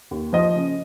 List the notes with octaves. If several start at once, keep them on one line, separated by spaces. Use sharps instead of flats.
D#2
F3 D#5
C#3